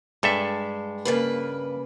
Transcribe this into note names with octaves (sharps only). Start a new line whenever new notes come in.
G2 G#3 A4 E5
C#3 A#3 B4